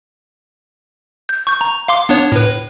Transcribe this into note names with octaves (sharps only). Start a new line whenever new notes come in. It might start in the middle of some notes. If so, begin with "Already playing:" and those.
G6
C#6 G6
A#5
F5 C6 D6
B3 D4 C#5
A2 B4